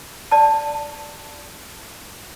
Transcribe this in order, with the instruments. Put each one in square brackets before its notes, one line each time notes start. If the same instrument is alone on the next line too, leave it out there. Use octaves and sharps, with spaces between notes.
[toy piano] D5 A5